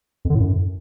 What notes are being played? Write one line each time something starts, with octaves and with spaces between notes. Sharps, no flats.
F2
D3
A2
F#2